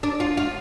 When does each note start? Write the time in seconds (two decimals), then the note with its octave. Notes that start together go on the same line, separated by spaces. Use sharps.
0.03 D4
0.20 F4
0.37 F4